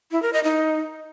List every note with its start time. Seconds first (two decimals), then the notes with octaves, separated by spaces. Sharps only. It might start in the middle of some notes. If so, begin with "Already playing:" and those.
0.12 E4
0.22 A#4
0.33 D#5
0.44 D#4